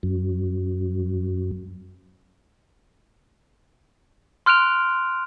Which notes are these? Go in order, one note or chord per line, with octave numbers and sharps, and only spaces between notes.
F#2
C6 F6 F#6 D7 F7